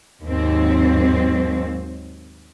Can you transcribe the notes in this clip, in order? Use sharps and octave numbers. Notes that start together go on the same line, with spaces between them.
D#2 G#2 F#3 C4